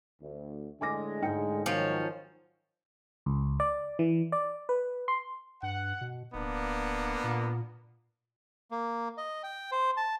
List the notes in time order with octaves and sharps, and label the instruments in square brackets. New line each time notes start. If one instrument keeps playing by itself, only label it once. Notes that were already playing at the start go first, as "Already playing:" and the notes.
[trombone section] D2
[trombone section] A2 D3 G#3 [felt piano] G#5 D6 A#6
[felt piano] G#2 G5 C#7
[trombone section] D#3 F#3 [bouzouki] F3 C#4
[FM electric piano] C#2
D5
E3
D5
B4
C6
[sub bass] G2 [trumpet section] F#5
[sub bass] B2
[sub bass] D1 [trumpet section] A#3 B3 D4
[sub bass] A#2
[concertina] A#3
D#5
G5
C5
A5